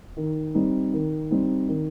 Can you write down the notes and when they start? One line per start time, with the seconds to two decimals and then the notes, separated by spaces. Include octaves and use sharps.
0.17 D#3
0.55 G3 C4 D#4
0.94 D#3
1.31 G3 C4 D#4
1.69 D#3